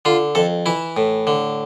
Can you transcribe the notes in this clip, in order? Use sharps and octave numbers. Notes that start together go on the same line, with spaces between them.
D3 F4
F2 A4
E3 E4
A2
D3